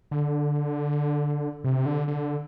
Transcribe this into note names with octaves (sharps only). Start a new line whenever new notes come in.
D3
C3
D3
D3